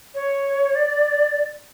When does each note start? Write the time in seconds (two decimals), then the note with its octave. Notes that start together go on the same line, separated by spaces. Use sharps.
0.14 C#5
0.75 D5